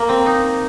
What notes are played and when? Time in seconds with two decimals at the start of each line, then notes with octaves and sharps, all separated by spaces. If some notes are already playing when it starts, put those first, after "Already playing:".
Already playing: A#3
0.09 C4
0.26 D#4